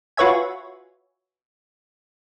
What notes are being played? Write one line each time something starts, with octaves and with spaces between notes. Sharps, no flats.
F4 F#4 B4 C#5 E5 G#5